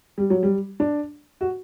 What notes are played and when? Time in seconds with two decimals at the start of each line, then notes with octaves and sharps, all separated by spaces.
0.18 G3
0.30 F#3
0.43 G3
0.80 D4
1.41 F#4